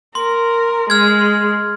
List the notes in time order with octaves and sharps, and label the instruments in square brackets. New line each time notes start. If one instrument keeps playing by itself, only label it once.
[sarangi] A#4 [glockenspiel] C6
[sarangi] G#3 [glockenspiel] F6 G#6